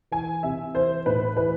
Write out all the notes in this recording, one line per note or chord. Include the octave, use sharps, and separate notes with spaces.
E3 G#5
C3 E5
E3 C5
A2 B4
E3 B4